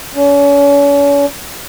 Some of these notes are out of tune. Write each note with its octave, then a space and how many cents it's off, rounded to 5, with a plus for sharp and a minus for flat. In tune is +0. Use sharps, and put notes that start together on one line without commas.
C#4 +40